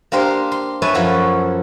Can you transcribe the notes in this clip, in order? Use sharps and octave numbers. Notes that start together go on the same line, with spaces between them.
A#3 D4 G4 A#4 C5
C6
B4 C#5 E5 G#5 A5
F#2 F3 F#4 A4